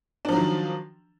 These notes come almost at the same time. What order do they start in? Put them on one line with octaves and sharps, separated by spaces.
D4 F3 F#3 D#3